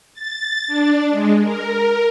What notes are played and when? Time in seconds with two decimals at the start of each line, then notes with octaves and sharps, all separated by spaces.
0.14 A6
0.67 D4
1.10 G#3
1.41 A#4